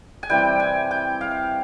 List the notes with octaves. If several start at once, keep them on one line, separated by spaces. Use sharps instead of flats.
G#5
C3 E3 G3 G5
G#5
G5
F5